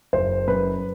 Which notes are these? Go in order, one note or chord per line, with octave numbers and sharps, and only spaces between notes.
F#1 C5
F#2 B4